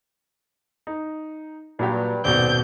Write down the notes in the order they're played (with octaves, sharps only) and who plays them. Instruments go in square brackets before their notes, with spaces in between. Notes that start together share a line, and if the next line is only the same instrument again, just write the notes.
[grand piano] D#4
[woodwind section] G2 [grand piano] A#2 F#3 G4
[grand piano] D#1 G#1 B2 [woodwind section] C4 D5 [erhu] G6